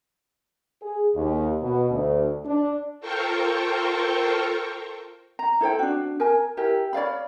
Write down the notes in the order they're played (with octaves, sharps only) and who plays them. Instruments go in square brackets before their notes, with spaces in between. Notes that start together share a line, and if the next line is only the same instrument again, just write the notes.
[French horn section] G#4
D#2
B2
D2
D4
[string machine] F4 A4 A#4 C5 G5 C#6
[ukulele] A#5
E4 A4 C5 G5
D4 F#4
A#4 G#5
E4 G4 A#4
C#5 D5 F5 B5